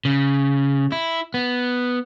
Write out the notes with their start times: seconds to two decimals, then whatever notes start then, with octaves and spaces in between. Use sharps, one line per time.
0.05 C#3
0.92 E4
1.34 B3